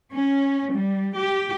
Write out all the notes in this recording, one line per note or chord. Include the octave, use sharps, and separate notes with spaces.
C#4
G3
G4